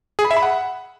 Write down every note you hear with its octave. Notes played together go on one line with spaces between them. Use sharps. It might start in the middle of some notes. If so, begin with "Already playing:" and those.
G#4
B5
E5
B5
F#5